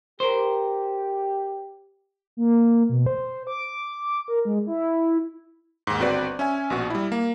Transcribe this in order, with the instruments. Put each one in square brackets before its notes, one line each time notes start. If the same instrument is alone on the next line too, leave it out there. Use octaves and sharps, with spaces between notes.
[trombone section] G4 [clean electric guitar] A#4 C5
[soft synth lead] A#3
B2
C5
D6
A#4
G#3
E4
[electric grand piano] D#2 G#2
G1 C4 F#4 B4 D5
C#4 E5 G#5
A#1 B2 F#4
G3 E4
A#3